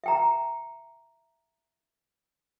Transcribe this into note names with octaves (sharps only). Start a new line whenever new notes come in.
E5 G5 A#5